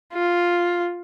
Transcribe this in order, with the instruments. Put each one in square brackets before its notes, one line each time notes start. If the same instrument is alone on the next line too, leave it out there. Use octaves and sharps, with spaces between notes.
[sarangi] F4